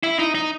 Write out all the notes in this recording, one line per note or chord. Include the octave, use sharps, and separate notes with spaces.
E4
D#4
D#4